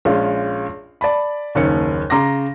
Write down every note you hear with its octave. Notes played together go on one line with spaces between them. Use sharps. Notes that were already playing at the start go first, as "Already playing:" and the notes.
A#1 G#3 C#4 F4
D5 A5 B5
F#1 D#2 C#4 C#7
C#3 A#5 C6 D6 A#6